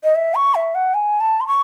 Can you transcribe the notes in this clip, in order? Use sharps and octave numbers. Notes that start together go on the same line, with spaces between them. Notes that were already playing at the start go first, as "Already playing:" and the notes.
D#5
E5
C#6
E5
F#5
G#5
A5
C6
C#6